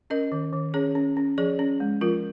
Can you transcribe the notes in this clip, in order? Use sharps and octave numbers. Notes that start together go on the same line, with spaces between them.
C#4 A#4 D#5
D#3
D#3
C#4 G#4 C#5
C#4
C#4
F3 G#4 C#5
C#4
G#3
F3 F4 A#4